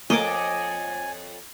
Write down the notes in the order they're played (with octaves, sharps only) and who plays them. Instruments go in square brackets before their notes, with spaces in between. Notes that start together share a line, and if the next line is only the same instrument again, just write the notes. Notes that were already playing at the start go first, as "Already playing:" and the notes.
[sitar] F2 C#5 [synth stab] A3 A#3 [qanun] D#5 D6 [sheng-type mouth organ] G#5